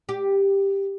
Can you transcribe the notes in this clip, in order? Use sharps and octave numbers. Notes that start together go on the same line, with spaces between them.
G4